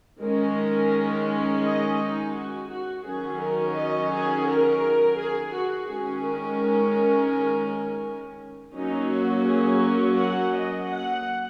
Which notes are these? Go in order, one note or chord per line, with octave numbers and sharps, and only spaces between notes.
D#3 G#3 C#4 A#4
D#5
D#4
F#4
F#4
D#3 F#3 C#4 G#4
A#4
D#5
G#4
A#4
G#4
F#4
D#3 G#3 C#4 G#4
A#4
F#3 A#3 C#4 D#4
F#4
G#4
A#4
F#5
D#5
F#5